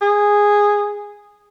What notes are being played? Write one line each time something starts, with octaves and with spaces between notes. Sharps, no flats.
G#4